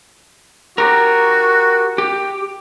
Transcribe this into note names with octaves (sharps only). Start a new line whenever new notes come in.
F#4 G4 A#4
G4